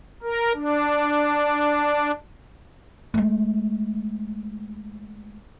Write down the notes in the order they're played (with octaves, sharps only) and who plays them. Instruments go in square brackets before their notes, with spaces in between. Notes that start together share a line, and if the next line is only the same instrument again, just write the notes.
[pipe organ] A#4
D4
[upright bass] G#3 A3